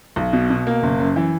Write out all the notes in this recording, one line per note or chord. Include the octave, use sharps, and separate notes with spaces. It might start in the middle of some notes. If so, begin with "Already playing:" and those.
B1
B2
B2
A#3
F#1
F#2
E3